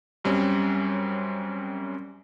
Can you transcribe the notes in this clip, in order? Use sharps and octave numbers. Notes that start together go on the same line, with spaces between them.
F#2 G3 C4 C#4